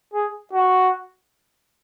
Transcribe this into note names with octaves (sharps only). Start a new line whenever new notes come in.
G#4
F#4